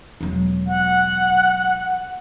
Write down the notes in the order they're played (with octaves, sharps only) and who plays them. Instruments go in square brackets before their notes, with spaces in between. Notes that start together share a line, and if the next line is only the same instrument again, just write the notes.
[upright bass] E1 F#3
[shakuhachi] F#5